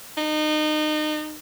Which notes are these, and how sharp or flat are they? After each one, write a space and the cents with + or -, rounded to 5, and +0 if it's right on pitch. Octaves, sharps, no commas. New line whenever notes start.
D#4 -30